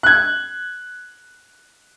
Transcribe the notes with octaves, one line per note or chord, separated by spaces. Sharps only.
F#6 G#6